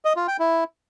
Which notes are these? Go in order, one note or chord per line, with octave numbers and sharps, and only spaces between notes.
D#5
F4
G5
E4